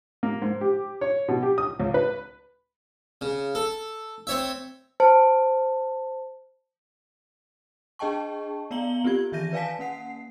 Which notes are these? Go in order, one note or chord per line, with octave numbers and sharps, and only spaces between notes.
A#3
G#2
G4
C#5
B2
G4
D#6
C#2
B4
C#3
A4
C4 C#5 E5
C5 A5
D4 G#4 D#5 G5 A5 C#6
B3 D5 F5 A#5 F#7 G7
C4 F4 G4 G#6
D#3 E3 E5 G6 A#6 D#7
B4 D5 F5 G#5 A5 B6
A#3 C#4 F#5 C7